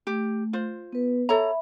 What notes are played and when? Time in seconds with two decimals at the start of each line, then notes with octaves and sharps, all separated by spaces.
0.07 A3 G4
0.53 F4 C5
0.93 B3 B4
1.29 A4 C#5 E5 A#5 B5